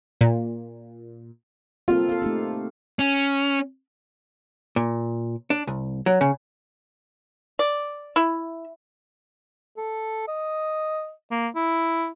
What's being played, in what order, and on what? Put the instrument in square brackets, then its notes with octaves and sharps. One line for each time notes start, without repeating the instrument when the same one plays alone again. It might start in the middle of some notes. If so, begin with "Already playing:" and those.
[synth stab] A#2
[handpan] A#3 C4 A4 [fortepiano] F4
[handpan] A4 F5
A3 D#4 G4
[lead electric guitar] C#4
[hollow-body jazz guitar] A#2
D4
C2
F#3
C#3
[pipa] D5
E4
[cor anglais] A4
D#5
A#3
E4